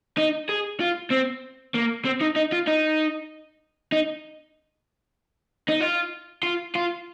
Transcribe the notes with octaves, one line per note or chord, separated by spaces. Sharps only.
D#4
G#4
F4
C4
A#3
C4
D#4
D#4
F4
D#4
D#4
D#4
F4
F4
F4